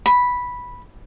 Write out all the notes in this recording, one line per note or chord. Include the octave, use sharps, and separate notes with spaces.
B5